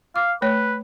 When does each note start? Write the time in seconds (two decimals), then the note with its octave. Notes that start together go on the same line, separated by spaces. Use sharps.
0.16 F5 D6
0.42 A3 B4 C#5